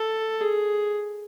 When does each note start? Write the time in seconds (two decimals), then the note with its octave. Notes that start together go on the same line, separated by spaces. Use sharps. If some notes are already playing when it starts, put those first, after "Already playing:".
Already playing: A4
0.40 G#4